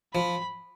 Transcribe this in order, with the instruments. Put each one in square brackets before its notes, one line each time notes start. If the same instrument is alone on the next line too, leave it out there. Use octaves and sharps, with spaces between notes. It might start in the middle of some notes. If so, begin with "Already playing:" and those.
[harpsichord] F3 [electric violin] B5